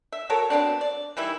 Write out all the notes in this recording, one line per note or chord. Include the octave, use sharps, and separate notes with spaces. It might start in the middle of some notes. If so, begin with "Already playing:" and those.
E5
F#3 A4 A#4 C#5
F#3 B3 C4 D4
D5
D#3 E3 G3 E4